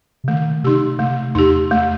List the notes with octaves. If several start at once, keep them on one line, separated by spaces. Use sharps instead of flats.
C3
D#3 A3
C3 D#4 G4
C3 A3
E2 D#4 G4
A3